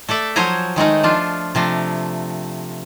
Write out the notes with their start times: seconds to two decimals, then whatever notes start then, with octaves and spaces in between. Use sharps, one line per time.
0.09 A3 A4 D5 E5
0.36 F3 F#3 C5 C#5 G#5 A#5
0.76 D#3 G#3 A3 D#4
1.03 F3 D4 F4
1.55 C3 F3 A3 D4